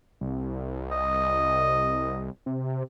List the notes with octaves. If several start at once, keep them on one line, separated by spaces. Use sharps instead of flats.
C2
D#5
C3